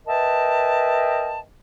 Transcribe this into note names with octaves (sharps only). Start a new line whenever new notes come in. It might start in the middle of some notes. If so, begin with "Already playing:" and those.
A#4 B4 D#5 E5 G5 A5